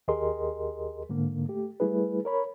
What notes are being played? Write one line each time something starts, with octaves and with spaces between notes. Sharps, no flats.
D#2 G4 G#4 A#4 D#5 C6
G#2 D3 A#3
A3 G4
G3 A3 E4 G#4 B4
A#4 C#5 B5